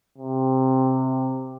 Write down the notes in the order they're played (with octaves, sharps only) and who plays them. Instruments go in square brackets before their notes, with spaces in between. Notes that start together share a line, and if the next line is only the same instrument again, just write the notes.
[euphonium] C3